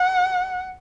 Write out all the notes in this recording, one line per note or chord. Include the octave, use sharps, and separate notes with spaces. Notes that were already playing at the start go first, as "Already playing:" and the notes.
Already playing: F#5